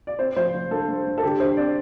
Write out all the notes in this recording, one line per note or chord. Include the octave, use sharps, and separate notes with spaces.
D5
C4 C5
F3 C5
F3
G2 A4
G2
G2
A4
D3 G4
D3 C5
C4 D5